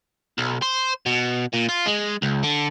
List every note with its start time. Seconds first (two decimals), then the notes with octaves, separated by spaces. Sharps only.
0.38 B1
0.62 C5
1.06 B2
1.53 A#2
1.69 F4
1.86 G#3
2.22 C#2
2.43 D3